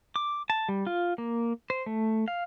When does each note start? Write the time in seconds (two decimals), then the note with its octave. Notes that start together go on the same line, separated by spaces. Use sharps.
0.16 D6
0.50 A5
0.69 G3
0.87 F4
1.18 A#3
1.70 C5
1.86 A3
2.28 F5